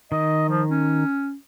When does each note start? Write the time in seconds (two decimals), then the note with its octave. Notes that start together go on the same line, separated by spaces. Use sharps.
0.12 D#3 D#5
0.49 F3
0.71 C#4